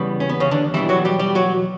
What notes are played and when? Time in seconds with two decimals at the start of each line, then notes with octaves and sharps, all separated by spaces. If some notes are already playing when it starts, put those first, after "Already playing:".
Already playing: E2 C#3 G3 B3
0.20 C#4
0.29 B3
0.40 C#3 C#4
0.51 D3 D4
0.74 E2 B2 E3 G3 E4
0.89 F#3 F#4
1.05 G3 G4
1.19 G3 G4
1.35 F#3 F#4